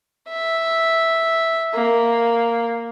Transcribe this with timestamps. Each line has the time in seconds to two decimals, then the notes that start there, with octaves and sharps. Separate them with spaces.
0.28 E5
1.74 A#3